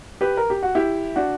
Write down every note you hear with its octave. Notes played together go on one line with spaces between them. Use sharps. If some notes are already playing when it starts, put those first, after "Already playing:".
G4 B4
A#4
G4
F#4
E4 G4
D4 F#4